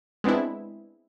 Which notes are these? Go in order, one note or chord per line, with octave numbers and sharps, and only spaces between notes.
G#3 B3 C4 D4 E4